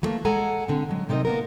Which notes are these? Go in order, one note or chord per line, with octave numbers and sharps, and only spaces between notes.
E3 F#3 A3 A#3
G#3 A4 F#5 G#5 A#5
D3 C4
F#3 G#3
C3 C4 D#4 A#4 D#5
A#3 B3 A#4